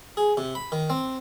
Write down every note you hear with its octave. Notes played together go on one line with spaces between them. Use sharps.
G#4
C3
B5
D#3
C4